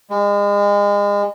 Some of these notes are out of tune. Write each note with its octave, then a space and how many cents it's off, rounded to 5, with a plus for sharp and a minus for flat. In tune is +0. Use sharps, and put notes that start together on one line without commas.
G#3 -35